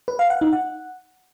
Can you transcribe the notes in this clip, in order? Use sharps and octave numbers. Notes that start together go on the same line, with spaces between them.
B4
F5
F#5
D#4
F#5